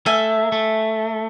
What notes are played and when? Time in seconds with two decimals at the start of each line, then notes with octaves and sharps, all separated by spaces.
0.06 A3 E5 G#5
0.52 A3